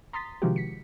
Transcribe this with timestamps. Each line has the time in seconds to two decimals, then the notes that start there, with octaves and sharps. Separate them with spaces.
0.13 A#5 C6 D#6 A6 B6
0.42 C3 D#3 F3 G#3 F#4 G4
0.56 B6 C#7